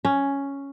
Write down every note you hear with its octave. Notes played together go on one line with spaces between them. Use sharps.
C#4